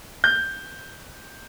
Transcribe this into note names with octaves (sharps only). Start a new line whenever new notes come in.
G6